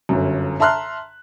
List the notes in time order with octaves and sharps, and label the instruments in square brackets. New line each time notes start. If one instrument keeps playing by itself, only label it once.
[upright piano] G1 F#2
E5 A5 A#5 C6 F6 F#6